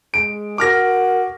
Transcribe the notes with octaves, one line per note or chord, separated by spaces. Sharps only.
G#3 D7
F#4 A#4 D6 F6 A#6